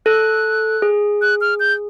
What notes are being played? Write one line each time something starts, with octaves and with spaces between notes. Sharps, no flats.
A4 F#6
G#4
F#6
F6
G6